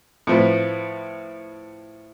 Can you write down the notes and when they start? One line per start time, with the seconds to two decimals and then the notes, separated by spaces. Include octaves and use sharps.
0.27 A2 F3 B4